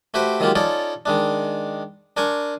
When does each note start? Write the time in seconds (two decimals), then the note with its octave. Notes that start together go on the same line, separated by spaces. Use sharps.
0.14 A3 F#4 G4 B4 C5 G5
0.40 D#3 F#3 G#3 A#3 F4 G4
0.56 C#4 D#4 F4 A4 C#5 D5
1.06 D#3 G#3 D4
2.17 D4 A#4 G#5 C6 C#6